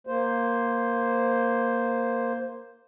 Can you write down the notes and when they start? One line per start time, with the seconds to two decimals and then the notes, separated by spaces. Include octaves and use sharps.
0.07 A#3 C5